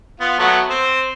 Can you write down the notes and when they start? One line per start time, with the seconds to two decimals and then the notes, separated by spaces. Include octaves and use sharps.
0.20 B3 F4
0.39 F#3 A3 B3
0.70 C4 C5